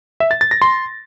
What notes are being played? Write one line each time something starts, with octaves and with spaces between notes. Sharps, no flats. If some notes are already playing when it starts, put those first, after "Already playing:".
E5
A6
A6
A#6
C6